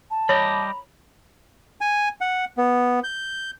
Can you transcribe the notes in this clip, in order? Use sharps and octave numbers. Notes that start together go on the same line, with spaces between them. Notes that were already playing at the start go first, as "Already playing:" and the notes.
A5
G3 G4 C#5 D#5 A#5 B5
G#5
F#5
B3
G6